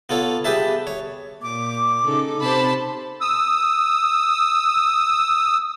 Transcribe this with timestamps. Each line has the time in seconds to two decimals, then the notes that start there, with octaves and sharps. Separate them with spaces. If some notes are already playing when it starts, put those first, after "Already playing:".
0.09 B3 F4 A4 C#5
0.44 G4 G#4 B4 E5 A5
0.87 C#5
1.42 A#2 D6
2.05 C#3 D#4 A4
2.40 C3 C5 A5 B5
3.21 D#6 E6